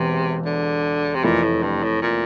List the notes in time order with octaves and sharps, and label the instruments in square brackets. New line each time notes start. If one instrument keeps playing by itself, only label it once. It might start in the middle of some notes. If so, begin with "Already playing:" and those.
Already playing: [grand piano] E1 E2 E3 [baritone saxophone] C3
[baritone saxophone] D3
C3
[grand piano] F1 F2 E3 A3 E4 [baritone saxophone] A#2
[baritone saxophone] A2
G2
A2
A#2